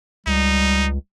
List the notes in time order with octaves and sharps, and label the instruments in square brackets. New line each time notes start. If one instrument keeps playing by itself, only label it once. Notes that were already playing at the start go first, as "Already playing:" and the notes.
[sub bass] C#2 [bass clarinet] G3 [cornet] D#4